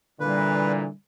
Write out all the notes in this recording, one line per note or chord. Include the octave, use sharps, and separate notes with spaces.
A#2 D3 E3 G3 B4